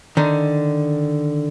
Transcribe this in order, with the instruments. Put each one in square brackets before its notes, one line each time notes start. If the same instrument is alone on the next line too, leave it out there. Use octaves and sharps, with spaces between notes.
[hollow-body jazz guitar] D3 D#3